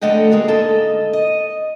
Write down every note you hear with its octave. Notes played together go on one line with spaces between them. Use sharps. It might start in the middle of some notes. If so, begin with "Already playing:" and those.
F2 D3 A3 D#5 F#5 G5
G#3 A#3 F#4
G#2 D3 A#3 A4 D#5
D#5